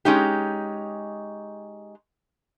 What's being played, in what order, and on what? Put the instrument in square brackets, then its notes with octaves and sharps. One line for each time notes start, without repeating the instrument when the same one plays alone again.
[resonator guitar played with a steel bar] G#3 C#4 D#4 G4